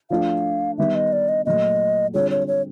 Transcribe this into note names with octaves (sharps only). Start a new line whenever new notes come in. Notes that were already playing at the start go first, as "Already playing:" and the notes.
F3 A3 D4 F4 F5
D#3 G3 B3 D#4 E5
D#5
D5
D#5
A#2 F#3 A3 D#5
D3 G3 C4 F4 G#4 C#5
C#5
C#5